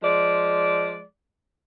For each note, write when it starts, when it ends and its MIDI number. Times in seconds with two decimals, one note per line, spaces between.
0.03 1.03 53
0.03 1.03 56
0.03 1.03 74